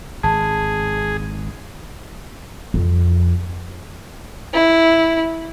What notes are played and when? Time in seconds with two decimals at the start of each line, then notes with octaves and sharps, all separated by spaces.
0.23 G#1 G#4 A5
2.74 F2
4.54 E4